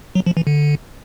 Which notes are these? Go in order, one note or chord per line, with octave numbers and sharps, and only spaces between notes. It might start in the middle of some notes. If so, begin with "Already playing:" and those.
F#3
F3
E3
D3